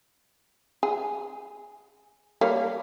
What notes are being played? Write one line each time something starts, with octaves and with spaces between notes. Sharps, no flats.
G#4
G3 A#3 C#5